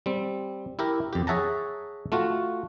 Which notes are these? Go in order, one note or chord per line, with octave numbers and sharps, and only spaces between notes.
G3 C4
E4 G4 A#4
F2 G4
G#4 C#5 E5 F#5 A5 A#5
A3 F4 F#4